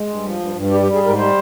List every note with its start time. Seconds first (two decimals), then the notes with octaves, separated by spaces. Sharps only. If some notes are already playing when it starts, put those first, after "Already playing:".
Already playing: G#3
0.09 G2
0.24 F3
0.40 G2
0.56 G2
0.71 G3 G4
0.83 G4
0.86 G3
0.94 G#4
1.03 G#2 A#4
1.18 G3 C5